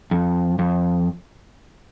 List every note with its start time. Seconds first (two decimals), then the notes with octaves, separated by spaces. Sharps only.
0.11 F2
0.59 F2